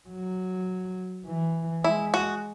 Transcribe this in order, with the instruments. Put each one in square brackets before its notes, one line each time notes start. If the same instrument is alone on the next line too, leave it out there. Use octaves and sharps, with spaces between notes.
[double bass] F#3
E3
[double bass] G#3 [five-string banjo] E4
[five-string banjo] F#4